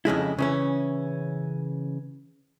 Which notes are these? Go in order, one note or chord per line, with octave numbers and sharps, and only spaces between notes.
F2 C#3 G#3 E4
C#3 E3 C#4